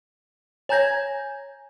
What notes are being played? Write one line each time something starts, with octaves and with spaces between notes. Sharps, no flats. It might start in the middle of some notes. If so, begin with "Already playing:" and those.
C#5 G#5 A#5 G6 G#6 A#6